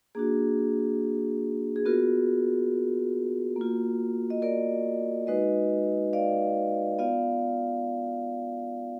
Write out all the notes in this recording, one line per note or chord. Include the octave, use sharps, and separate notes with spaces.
A#3 D4 F#4 G#4
G#4
B3 F4 F#4 A#4
A#3 F4
D#5
A#4 D5
G#3 D#4 F#4 B4 D#5
D5 F5
B3 F4 D5 F5